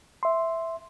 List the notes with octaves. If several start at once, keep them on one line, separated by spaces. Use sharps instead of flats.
E5 C6